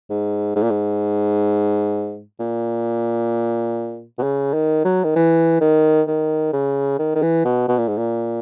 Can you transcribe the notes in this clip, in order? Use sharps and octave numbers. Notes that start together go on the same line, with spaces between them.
G#2
G#2
A#2
G#2
A#2
B2
C#3
D#3
F#3
D#3
E3
D#3
D#3
C#3
D#3
D#3
E3
B2
B2
A#2
G#2
A#2